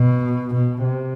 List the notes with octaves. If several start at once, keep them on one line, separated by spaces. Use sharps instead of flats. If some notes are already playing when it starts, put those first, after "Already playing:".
Already playing: B2
B2
C3